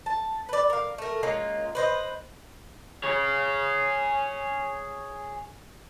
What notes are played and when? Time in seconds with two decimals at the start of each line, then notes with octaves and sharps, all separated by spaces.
0.06 A5
0.49 B4 D5
0.70 A#4 F5
0.98 A3 A#4
1.23 G#3 A#3 C#4 F4
1.75 B4 C5 D#5
3.03 G#4 C#5